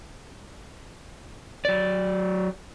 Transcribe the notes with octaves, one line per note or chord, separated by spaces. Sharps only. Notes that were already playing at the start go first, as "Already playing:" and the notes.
F#3 D5